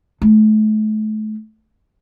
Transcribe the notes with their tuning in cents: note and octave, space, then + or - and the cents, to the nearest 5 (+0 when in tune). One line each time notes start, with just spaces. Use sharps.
A3 -35